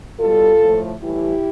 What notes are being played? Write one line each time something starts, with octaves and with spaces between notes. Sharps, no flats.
B2 G3 F4 A4
A2 F3 A3
A2 E3 G3 E4 G4